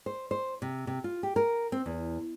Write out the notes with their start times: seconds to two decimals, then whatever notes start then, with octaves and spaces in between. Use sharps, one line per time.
0.06 C5
0.31 C5
0.62 C3
0.87 C3
1.04 F4
1.23 G4
1.36 A#4
1.72 C4
1.86 E2